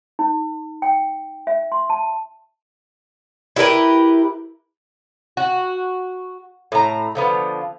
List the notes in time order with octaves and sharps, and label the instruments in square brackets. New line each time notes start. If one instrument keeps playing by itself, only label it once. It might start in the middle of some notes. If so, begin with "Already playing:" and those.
[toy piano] D#4
G5
E5
C6
A5
[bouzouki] E4 G4 A#4 B4
F#4
A2 A#5
D3 F3 B3